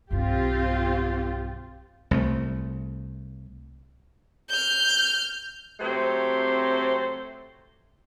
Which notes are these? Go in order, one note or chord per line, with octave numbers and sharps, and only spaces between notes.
B1 G2 C4 F4 G4
C2 A3
F6 G6
C3 F#3 A3 C4 G4 C5